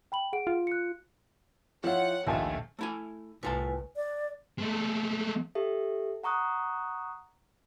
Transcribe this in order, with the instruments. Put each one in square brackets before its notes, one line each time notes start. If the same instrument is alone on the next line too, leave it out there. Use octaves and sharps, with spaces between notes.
[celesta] G5 B5 F#7
G#4 F#5 D7
[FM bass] F4
[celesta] F#6 C#7
[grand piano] F3 E4 F4 [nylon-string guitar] C4 C#5 [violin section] F#5
[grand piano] A#1 D#2 G#5 [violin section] A3 [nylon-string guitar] F4 F5
[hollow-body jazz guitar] A3 E4 G#5
[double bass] C2 [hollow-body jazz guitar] A2 F4 A5 [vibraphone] B4 G#5
[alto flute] D5
[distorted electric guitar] G#3 A3
[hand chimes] G4 A4 E5
F#5 A#5 C#6 D#6 F#6